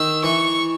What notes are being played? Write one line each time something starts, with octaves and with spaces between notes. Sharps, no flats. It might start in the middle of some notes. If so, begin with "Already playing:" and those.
Already playing: D#3 E6
E3 C#6